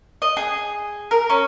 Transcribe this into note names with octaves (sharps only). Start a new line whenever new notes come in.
D#5
G#4
A#4
C#4